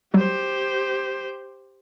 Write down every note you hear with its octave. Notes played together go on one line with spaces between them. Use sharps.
F#3 G3 F#4 G4 C5